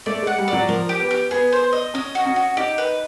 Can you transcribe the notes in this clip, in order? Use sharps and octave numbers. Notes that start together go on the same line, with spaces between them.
A3 D5
G#3 F#5
G3
D5
F#3
F3 A#4
G4
B3
G4
B3 G#4
C5
D#5
C#4 D#5
F#4
C#4
F#4
D#4 G4
B4